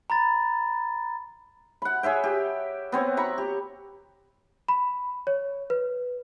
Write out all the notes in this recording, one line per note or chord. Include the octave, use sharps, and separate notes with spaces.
A#5 B5 A6
F#5 B5
G#4 C#5 E5 G5
G4
B3 C4 C#5
A#5 B5 C#6
G4
B5
C#5
B4